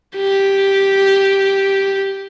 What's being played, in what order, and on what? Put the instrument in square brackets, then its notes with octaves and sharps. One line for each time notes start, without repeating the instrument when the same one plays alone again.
[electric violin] G4